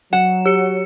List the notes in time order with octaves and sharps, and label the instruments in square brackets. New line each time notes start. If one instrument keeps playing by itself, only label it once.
[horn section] F#3 [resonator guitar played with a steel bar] F#5 [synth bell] E7
[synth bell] G4 C#7